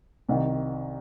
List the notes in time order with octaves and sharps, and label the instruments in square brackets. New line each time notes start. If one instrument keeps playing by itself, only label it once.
[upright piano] C2 C3 D#3